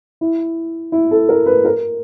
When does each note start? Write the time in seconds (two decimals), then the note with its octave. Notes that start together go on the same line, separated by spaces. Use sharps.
0.21 E4
0.92 E4
1.11 A4
1.29 A#4
1.46 B4
1.65 A#4